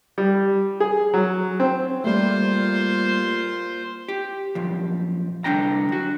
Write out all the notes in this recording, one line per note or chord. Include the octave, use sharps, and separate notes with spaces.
G3
G#4
F#3
C4
A#2 G3 A3 F4 C5
G4
F#2 A#2 F3
C2 F2 D3 D4 G5 A#5
F#2 F#4